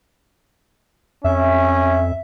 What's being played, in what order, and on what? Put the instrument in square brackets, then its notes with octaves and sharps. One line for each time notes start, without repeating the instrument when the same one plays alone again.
[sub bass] F2 [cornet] C#4 [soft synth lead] E5